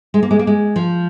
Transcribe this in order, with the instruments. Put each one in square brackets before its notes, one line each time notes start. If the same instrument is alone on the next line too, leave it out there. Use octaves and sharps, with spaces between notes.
[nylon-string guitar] G#3
A#3
G#3
A#3
G#3
F3